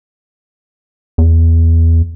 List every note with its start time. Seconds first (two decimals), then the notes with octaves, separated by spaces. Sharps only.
1.18 E2